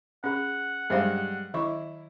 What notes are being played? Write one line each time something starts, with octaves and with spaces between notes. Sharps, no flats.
C#4 G#4 F#5
G2 F#3 G#3 C5 F5
D#3 E4 D#5 C#6